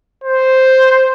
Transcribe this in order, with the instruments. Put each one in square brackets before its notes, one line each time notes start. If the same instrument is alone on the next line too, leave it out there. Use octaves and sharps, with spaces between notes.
[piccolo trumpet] C5